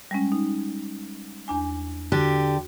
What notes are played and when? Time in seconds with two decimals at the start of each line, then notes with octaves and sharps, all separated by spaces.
0.11 G3 G#3 C#4
0.32 D#4
1.48 E2 D4 G#5
2.12 D3 F#4 G4